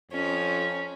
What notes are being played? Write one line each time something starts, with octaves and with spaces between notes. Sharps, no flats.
F2 C#4